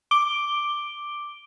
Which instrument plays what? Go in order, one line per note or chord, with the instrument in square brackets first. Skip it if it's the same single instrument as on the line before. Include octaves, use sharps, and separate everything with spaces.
[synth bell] D6 D7 G7